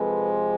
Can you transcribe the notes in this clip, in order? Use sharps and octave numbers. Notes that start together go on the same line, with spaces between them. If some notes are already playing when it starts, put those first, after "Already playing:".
Already playing: C3 F3 G#3 C4 A4 B4